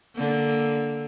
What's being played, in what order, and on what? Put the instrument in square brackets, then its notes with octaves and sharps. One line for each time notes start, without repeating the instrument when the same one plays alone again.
[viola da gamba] D3 A#3